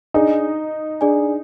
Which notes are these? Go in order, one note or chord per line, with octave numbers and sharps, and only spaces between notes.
D4 D#4 G#4 D5 G#5
D4 G#4 D5 G#5